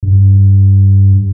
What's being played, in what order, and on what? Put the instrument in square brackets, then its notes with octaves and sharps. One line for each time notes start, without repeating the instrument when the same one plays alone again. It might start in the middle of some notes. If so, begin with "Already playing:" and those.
[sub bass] G2